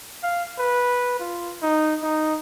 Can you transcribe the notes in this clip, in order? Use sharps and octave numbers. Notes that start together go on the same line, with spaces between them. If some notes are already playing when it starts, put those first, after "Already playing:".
F5
B4
F4
D#4
D#4